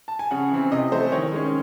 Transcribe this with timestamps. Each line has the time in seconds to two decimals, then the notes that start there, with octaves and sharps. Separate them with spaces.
0.08 A5
0.19 G#5
0.31 C#3 F#5
0.52 E3 C4
0.71 C3 D#5
0.92 E3 A3 C5
1.12 D#3 C#5
1.32 G#3 C#4